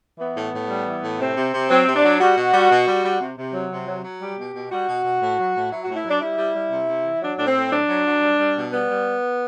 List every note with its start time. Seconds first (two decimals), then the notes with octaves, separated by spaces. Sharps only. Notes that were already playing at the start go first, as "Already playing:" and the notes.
0.19 E3 B3
0.36 A2
0.53 A2
0.69 G3
0.86 E3
1.03 A2
1.19 C3 C4
1.37 C3
1.53 C3
1.70 F#3 C4
1.87 C3
1.95 D4
2.04 F#3
2.20 G3 F#4
2.37 B2
2.53 G3
2.70 B2
2.87 G3
3.04 G3
3.20 C3
3.37 C3
3.54 F#3
3.70 C3
3.87 F#3
4.04 F#3
4.21 G3 G4
4.37 B2
4.54 B2
4.71 G3 F#4
4.88 B2
5.05 B2
5.21 A2
5.38 F#3
5.55 A2
5.71 F#3 E4
5.84 A2 F#4
5.96 E4
6.05 F#3 D4
6.21 G3 E4
6.38 G3
6.55 G3
6.71 C3
6.88 C3
7.05 E3
7.22 F#3 D4
7.37 A2 D4
7.47 C4
7.55 A2
7.72 F#3 D4
7.88 F#3
8.05 F#3
8.22 G3
8.39 G3
8.56 B2
8.72 G3 B3
8.89 G3